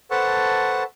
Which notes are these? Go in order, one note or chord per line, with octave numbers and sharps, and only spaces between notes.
A4 B4 C5 F#5 A5 C#6